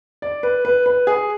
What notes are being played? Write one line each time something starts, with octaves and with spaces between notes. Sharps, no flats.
D5
B4
B4
B4
G#4